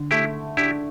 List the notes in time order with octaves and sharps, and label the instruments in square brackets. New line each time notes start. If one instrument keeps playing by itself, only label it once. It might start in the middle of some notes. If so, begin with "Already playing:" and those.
Already playing: [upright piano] D3
[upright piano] A3 [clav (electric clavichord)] E4 G4
[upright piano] D4 [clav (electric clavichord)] E4 G4